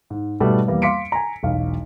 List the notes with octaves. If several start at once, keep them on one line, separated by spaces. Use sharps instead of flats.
G#2
G#2 B2 G3 A3
E2 G3 A#3 B3
F5 C6 D6 B6 C#7 D7
G#5 A#5
E1 B1 F5